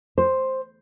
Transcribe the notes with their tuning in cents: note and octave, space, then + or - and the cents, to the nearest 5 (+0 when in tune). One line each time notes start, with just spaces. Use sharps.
C5 +5